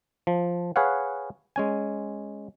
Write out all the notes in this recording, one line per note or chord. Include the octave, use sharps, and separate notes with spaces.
F3
G#4 B4 C#5 F5 F#5
G#3 C#4 G#5